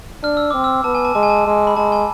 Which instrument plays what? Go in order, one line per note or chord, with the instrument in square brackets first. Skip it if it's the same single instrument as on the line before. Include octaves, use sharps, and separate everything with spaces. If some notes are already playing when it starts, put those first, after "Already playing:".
[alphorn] D4 [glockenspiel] F6
[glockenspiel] E6
[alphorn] C4 [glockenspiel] D6
[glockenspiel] E6
[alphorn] B3 [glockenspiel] A5
[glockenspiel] G#5
A5
[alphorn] G#3 [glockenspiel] A5
[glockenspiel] G#5
A5
[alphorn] G#3
[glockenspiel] B5
[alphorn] G#3 [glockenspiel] A5
[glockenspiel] G#5